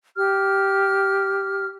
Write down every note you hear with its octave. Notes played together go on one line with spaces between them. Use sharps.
G4 F6